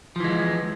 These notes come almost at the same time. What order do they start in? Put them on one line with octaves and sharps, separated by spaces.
F3 E3 G#3